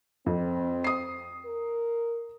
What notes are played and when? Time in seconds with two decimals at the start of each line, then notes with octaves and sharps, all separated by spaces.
0.26 F2 C4
0.84 D#6 C7
1.45 A#4